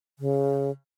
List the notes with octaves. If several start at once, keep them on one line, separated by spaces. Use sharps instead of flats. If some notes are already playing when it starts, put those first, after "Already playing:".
C#3